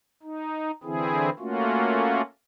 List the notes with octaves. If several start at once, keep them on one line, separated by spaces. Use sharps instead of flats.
D#4
D3 E3 C4 E4 G#4
A3 A#3 C#4 F4 F#4